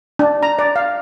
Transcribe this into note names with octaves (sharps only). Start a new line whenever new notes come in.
D4
A#5
D5
F5